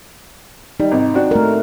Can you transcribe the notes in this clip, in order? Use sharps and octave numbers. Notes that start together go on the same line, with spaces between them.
G3 D#4
G#1 C3
C4 D4 F#4
A3 A#4